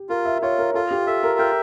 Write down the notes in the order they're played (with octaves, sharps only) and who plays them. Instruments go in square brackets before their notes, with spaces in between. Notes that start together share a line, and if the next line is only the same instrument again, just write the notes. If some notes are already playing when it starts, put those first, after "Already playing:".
Already playing: [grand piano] G4
[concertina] F4 [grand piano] A#4
[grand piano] E5
[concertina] F4 [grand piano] C#5
[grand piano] A#4
[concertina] F4 [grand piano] A4
[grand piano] G4
[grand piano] A4 [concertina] E5
[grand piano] A#4
[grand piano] A#4 [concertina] G5